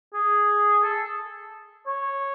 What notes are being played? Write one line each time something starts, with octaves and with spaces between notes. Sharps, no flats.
G#4
A4
C#5